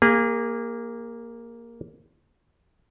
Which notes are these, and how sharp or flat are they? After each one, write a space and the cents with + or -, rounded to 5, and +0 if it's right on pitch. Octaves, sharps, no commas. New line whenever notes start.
A#3 +0 G#4 -35